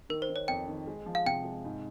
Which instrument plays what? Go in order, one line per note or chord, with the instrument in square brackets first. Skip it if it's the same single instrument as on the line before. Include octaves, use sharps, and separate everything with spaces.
[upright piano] D#3 [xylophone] A#4
[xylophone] C5
[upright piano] D#3
[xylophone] C#5
[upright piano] F2 [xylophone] G5
[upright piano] D#3
G#3
F3
[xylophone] F5
[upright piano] C3 [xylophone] G5
[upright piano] G#3
G#2